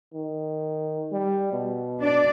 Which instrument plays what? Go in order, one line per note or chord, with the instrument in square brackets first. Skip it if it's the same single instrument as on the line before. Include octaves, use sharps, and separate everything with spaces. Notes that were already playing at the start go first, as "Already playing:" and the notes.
[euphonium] D#3
G3
B2
[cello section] D4 D5